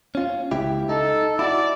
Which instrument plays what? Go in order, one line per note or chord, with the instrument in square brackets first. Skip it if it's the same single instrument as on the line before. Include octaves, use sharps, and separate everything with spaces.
[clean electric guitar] C#4 F4
C#2 E4 G4
[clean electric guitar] D#4 [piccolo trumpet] A4
[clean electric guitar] E4 F#4 [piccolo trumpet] D5